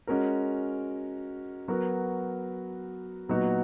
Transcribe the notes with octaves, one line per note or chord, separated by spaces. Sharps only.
G#3 C#4 F#4 A#4
F#3 B3 F#4 A#4
A#2 F#3 B3 D#4 F#4